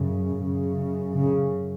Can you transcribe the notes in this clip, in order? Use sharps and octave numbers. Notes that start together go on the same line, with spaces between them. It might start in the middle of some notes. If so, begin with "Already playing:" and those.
Already playing: F#2 C#3
F#2 C#3
C#3